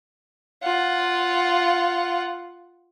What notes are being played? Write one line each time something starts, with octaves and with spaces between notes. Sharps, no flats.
F4 F#5